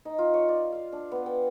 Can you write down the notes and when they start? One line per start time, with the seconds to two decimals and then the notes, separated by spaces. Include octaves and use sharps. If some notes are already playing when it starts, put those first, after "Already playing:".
0.05 D#4
0.18 F4
0.34 C#5
0.49 D5
0.72 F5
0.93 D4
1.12 B3
1.26 G5